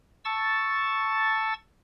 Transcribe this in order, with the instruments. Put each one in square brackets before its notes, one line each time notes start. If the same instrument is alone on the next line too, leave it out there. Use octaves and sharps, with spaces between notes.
[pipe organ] A5 C#6 E6 A6